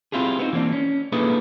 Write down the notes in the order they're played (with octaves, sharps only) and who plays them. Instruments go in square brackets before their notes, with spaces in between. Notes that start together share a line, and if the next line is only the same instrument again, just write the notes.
[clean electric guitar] C4 E4 F4 G4 G#4
B3 C4 D#4 F#4
E3 A#3 C4 D4
C#4
A#3 D4 E4 G#4 A4 B4